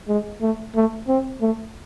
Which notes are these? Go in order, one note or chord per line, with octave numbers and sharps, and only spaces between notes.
G#3
A3
A3
C4
A3